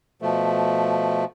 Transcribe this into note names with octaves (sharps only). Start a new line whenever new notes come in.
B2 F3 A3